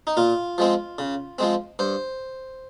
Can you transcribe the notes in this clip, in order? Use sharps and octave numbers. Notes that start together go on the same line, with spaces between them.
D#4
A#2 F4
F3 G#3 C4
C#3
F3 G#3 C4
G2 C5